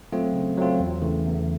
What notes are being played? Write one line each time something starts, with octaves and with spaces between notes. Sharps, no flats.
F#3 A3 C4 F4
C#3
F#3 A3 C4 F4
E2
C#3 E3 A3
E2